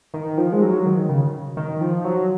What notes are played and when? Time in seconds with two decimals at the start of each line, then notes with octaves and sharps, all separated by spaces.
0.14 D#3
0.38 F3
0.52 G#3
0.62 F#3
0.86 D#3
1.09 C#3
1.57 D#3
1.81 F3
2.04 F#3